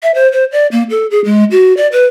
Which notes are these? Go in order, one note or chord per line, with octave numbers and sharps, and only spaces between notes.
E5
C5
C5
D5
A#3
A4
G#4
G#3
F#4
D5
B4